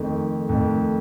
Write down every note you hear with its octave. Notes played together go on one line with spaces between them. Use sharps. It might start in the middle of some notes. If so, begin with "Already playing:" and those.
Already playing: F2 D#3 A3
F2 D#3 A3